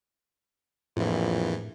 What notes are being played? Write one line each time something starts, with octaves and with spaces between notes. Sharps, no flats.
A#1 F2 A2 E3